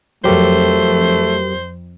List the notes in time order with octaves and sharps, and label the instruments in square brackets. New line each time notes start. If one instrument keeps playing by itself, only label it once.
[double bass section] F2 [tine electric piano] F#3 G4 A#4 [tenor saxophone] A3 [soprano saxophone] C5